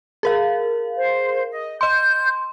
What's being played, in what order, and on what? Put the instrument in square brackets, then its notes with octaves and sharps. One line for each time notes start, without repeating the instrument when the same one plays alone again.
[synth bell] G#4 A#4 F5
[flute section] C5
D#5
[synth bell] D#5 C6 [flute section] G6